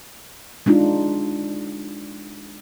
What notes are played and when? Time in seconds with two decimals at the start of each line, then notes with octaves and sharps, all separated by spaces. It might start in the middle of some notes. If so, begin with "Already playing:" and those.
0.66 G#3 D4 D#4 F4